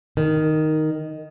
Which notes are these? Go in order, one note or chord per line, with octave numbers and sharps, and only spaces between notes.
D#3